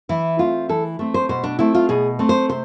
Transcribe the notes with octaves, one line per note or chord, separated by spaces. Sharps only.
E3 E4
A3 C4 F4
E3 A4
A3 C4
C5
B2 C5
D4
A3 C4 E4
F4
B2 G#4
A3 C4
C5
C3 C5